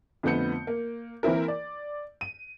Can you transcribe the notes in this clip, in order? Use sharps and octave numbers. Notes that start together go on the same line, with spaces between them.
F2 D3 A3 B3 G6 C#7
A#3
E3 A#3 C4 E4 A#4
D5
D#7